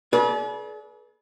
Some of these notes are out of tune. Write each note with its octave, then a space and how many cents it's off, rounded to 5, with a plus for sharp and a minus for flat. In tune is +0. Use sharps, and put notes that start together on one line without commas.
G#4 +45 B4 -35 D5 -20